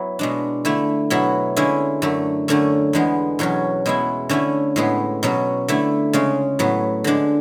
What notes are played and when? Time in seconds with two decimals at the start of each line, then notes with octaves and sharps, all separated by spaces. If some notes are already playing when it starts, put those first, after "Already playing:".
Already playing: F#3 B3 E4
0.19 B2 G#3 D4
0.65 D3 A3 E4
1.10 B2 F#3 B3 E4
1.56 D3 G#3 C#4 E4
2.02 F#2 D3 A3
2.48 F#2 D3 A3 C#4
2.93 E2 D3 G#3 B3
3.39 E2 B2 F#3 C#4
3.86 B2 G#3 B3 E4
4.29 D3 A3 C#4 E4
4.76 A2 G#3 B3
5.23 B2 F#3 C#4
5.68 D3 A3 E4
6.13 C#3 G#3 C#4
6.59 A2 F#3 B3
7.04 D3 G#3 D4